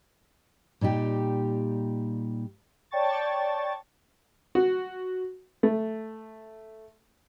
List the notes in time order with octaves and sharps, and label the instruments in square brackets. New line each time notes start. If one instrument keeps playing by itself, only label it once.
[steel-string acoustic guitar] A#2 G3 D#4 G4
[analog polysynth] C#5 D5 G5 A5 C#6 A6
[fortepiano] F#4
A3